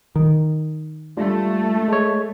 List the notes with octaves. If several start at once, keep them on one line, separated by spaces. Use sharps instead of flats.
D#3
G3 A3 D4 F4
G#3 C#5